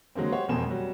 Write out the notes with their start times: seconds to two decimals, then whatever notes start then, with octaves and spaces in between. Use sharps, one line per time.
0.15 D3 F#3 G#3 A#3 C4
0.32 G4 C5 C#5 F#5
0.49 E1 F2 B2 C4 G#5 E7
0.67 F#3 G3